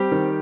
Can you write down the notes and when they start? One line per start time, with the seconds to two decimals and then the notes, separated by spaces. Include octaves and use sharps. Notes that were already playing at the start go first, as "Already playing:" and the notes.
Already playing: G3 C4 G4
0.11 D#3